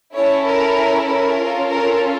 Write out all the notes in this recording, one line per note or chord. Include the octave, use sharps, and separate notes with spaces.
C#4 E4 A4 C#5
A#4
A#4
C#4 F4 A4
A#4